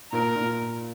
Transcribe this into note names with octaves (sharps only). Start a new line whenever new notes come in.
A#2 A#4
A#2